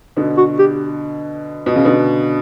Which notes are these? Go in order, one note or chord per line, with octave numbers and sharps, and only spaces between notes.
B2 D3
F#4
G4
B2
C#3
B2 D3